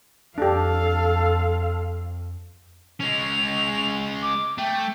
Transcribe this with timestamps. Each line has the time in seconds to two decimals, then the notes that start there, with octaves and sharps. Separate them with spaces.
0.38 F2 D4 G4 A4 F5
3.01 G#3 C#4 F7
4.22 D6
4.58 A3 G5